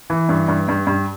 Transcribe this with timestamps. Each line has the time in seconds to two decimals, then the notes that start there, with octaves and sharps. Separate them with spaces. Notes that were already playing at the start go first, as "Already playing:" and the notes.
0.10 E3
0.29 G2
0.48 G2
0.68 G2
0.87 G2